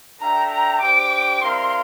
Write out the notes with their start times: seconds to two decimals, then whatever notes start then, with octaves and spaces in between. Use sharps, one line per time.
0.20 D4 A4 E5 G5 A#5
0.51 A#5
0.82 D4 G4 C5 G5 D6
1.42 G3 C4 E4 A#4 F5 C6